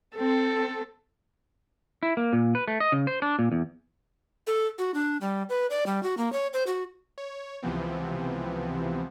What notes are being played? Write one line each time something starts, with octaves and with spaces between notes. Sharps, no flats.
C4 A4
E4
A#3
A#2
B4
A3
D#5
C#3
C5
D4
A#2
E2
A4
F#4
D4
G3
B4
D5
G3
F#4
A#3
C#5
C5
F#4
C#5
C#2 C3 E3 F3 B3 C4